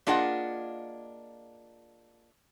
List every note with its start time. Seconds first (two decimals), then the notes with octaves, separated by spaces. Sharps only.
0.07 A#3 D4 F4 G#4 D#5 F#5